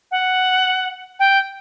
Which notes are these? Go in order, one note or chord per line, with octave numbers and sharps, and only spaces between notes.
F#5
G5